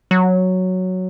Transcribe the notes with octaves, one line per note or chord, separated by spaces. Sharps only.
F#3